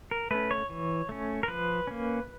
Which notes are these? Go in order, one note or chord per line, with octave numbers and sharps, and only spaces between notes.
A#4
A3 C#4 B4
C#5
E3
A3 C#4
A#4
F3 B4
A#3 C#4